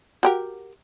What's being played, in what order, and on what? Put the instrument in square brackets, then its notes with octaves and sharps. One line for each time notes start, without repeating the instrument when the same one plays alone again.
[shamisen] F#4 G4 A#4